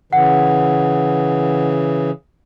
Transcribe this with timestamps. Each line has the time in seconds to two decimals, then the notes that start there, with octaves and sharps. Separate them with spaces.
0.13 C#3 E3 F#5